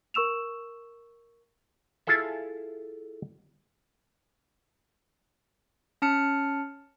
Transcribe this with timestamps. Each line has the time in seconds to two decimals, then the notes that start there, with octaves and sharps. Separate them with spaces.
0.14 A#4 C#6 E6 E7 F7
2.07 E4 F4 G#4 A4 E5
6.02 C#4 A5 F6 C#7